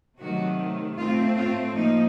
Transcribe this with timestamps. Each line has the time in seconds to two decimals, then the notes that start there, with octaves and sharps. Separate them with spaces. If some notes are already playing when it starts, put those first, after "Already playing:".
0.19 C3 D#3 F#3 A3 F#4
0.97 A2 A3 C4 F4
1.36 F4
1.75 F3 A#3 D#4